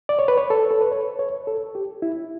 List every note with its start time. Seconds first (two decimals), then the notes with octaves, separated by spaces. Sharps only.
0.09 D5
0.19 C#5
0.28 B4
0.38 C#5
0.50 A4
0.71 A4
0.81 B4
0.92 C#5
1.19 C#5
1.47 A4
1.75 G4
2.02 E4